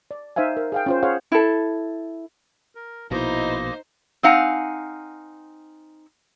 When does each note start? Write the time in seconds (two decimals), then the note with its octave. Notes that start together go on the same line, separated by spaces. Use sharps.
0.11 D5
0.36 D#4 C5 E5 F5 G#5
0.57 A#4
0.72 G#4 F5 G5
0.86 C#4 F4 C5
1.03 G#4 C5 C#5 F5 F#5
1.32 E4 A4
2.75 A#4
3.11 A#1 B2 A#3 D#4 E4 C5 D#5
4.23 C4 D#4 F5 F#5 G#5